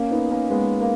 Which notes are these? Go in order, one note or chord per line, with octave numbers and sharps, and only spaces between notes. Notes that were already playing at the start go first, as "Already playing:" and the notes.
Already playing: A#3 C#4
B3 D#4
A#3 C#4
G#3 B3
A#3